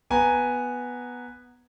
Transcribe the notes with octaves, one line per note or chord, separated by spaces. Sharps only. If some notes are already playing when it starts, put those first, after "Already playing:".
B3 B4 G#5 A#5